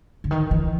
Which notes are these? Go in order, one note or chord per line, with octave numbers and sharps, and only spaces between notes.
D3
D#3
E3